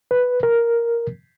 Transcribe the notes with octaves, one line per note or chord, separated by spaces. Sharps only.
B4
A#4